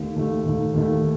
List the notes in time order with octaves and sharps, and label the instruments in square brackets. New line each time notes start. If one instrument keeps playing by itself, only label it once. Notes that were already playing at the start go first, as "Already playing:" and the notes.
Already playing: [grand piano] D#2 D#3 A3
D#2 D#3 A3
D#2 D#3 A3
D#2 D#3 A3